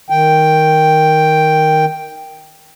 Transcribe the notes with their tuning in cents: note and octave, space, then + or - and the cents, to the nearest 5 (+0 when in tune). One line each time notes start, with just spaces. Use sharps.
D#3 +0 G5 +0